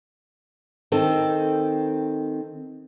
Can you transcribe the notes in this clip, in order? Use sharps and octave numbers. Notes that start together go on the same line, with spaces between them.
D#3 C4 A4